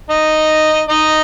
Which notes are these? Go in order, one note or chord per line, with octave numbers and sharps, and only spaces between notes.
D#4 D#5
D#4 D#5